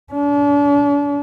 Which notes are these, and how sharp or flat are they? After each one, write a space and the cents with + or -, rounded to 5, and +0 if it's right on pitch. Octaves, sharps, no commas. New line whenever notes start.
D4 -40